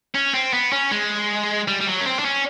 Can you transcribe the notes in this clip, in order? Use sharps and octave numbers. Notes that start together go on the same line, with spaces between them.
C#4
C4
B3
C#4
G#3
G3
G3
F#3
C#4
C4
D4
C#4